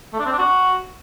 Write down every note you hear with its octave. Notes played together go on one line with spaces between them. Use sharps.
A3
D4
C4
D4
F#4